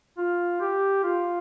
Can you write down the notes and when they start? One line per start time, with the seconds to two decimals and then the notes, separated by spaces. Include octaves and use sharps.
0.18 F4
0.61 G4
1.03 F4